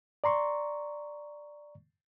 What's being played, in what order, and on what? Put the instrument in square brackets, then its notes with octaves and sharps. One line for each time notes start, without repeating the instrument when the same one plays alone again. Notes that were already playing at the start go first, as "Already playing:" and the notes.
[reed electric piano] D5 A#5 C6 C#6